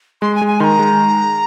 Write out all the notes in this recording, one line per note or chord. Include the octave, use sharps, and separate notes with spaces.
G#3 C6
G#5
G#3
G#5
D#3 A#5 C6
G#3